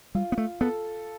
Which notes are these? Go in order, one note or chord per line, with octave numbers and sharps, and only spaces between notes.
G3 F4
B3
A3
B3 A4